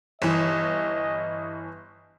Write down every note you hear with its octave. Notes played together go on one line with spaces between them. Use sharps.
G1 E3 D#5